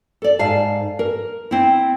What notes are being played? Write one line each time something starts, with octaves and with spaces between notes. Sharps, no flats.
A4 D5
G#2 F5 A5
A#4
C4 E4